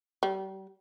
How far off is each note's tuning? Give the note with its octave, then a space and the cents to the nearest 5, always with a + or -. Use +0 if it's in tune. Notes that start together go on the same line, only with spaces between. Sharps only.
G3 -35